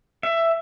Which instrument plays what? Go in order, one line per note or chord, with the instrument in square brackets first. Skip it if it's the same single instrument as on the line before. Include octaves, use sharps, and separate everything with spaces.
[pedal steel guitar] E5